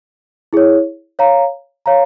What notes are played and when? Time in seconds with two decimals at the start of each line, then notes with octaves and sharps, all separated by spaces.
0.53 E4 G#4 C#5
1.19 C#5 F5 A#5
1.86 C#5 F5 A#5